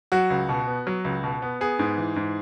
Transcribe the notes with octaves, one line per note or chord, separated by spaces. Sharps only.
F#3 F#4
C#2
B2
B3
F#3
C#2
B2
B3
B3 G#4
G#2
E3
G#2